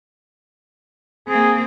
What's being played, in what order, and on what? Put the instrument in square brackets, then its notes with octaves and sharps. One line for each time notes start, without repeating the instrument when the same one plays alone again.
[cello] A#3 C4 [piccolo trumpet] G#4